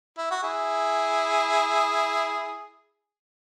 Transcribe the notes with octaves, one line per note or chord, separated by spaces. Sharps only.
E4
F#4
E4 G#4